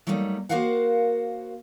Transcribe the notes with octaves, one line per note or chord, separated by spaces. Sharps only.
F#3 G3 A3 A#3 D4 D#4
A#3 F#4 A#4 C5 F5 F#5